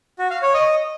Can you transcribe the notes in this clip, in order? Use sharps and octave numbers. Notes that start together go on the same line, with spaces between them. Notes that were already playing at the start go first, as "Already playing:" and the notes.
F#4
F5
C#5
D#5